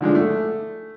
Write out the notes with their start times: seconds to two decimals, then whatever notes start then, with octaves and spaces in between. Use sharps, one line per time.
0.01 D3 F3 G#3 D4
0.15 A3